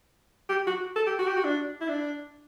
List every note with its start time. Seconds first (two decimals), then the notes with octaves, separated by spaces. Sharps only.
0.49 G4
0.67 F#4
0.96 A4
1.07 G4
1.19 F#4
1.27 G4
1.37 F#4
1.44 D4
1.81 E4
1.89 D4